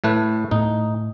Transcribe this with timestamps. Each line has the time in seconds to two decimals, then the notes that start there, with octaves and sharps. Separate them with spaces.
0.04 A2 A3 B4
0.51 A2 D#4